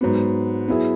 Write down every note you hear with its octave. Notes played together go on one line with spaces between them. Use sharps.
G#2 F#3 B3
F#3 B3 E4 G#4